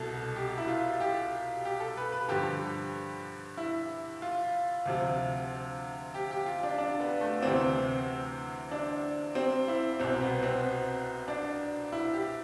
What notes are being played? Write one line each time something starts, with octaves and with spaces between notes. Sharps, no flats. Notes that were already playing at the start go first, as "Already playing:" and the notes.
Already playing: C2 B2 A4
G4
E4
F4
G4
G4
A4
B4
B4
G2 D3 F3 G4
E4
F4
D2 C3 F3
G4
G4
F4
D4
D4
B3
A3
D2 C3 E3 C4
D4
C4
E4
C2 B2 C4
B3
C4
D4
E4
G4